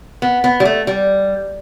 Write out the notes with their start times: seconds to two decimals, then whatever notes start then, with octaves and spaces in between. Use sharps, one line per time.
0.22 B3
0.44 B3
0.60 G3
0.65 A3
0.87 G3